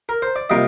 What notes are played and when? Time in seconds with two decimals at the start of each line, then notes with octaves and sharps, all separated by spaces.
0.09 A#4
0.22 C5
0.36 D5
0.50 C3 G3 A#3 F4 D#5